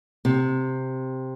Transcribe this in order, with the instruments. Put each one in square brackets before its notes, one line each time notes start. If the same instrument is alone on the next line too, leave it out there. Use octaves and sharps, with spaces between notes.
[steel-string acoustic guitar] C3